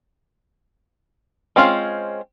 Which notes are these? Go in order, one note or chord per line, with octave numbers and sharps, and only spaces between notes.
G#3 C4 C#4 F4